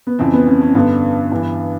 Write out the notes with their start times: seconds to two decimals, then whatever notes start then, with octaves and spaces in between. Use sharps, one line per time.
0.07 B3
0.19 F2 C#3 E3 C4
0.33 B3
0.47 C#4
0.61 C#4
0.75 G2 D3 B3
1.32 G2 E3